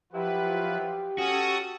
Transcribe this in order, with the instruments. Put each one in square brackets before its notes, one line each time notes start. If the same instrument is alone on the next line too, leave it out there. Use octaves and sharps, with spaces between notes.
[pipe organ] F3 B4 [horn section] F#3 E4 F4 [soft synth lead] G4
[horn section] C#4 [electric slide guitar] F#4 [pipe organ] A4 C#6 D#6